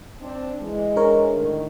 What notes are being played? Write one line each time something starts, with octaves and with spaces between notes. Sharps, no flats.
C4 D4
E3 G#3
D4 A#4 C#5
A2 D3 D#3